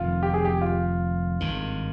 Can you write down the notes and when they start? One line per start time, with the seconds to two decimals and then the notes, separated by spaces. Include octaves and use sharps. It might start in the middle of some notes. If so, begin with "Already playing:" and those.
Already playing: F1 F2 D#3 F4
0.23 G4
0.34 G#4
0.45 G4
0.61 F4
1.40 G#1 G2 D#3